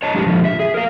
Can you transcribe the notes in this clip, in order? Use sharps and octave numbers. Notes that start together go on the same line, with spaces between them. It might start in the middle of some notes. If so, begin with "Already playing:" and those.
C#5 D#5 A5
G#3 D4 G4 G#4
A#2 D3 F3
E5
G#4
A#4 F5